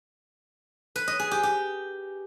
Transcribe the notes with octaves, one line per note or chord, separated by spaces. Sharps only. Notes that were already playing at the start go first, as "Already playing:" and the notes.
B4
D#5
G#4
G4
G4